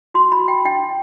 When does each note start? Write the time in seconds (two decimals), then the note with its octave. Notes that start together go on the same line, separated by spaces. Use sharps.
0.14 F#4 C6
0.32 B5
0.39 F#4
0.48 G5
0.65 D4 G5